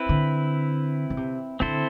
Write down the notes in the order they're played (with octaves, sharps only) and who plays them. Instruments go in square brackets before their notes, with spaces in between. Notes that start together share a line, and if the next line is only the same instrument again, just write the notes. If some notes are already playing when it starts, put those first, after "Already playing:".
Already playing: [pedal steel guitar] C4 E4 B4
[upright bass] D3
D3
C3
[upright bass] D3 [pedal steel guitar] C4 E4 A4 C5